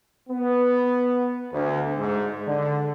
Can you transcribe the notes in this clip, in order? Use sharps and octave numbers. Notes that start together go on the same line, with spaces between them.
B3
D2
G#2
D3